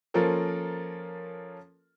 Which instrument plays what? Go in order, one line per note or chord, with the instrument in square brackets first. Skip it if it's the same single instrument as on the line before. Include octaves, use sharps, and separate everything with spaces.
[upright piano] F3 A#3 C#4 F4 A4 A#4